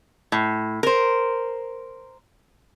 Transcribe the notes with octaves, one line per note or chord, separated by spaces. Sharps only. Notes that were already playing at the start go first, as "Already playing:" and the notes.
A2
A#4 C5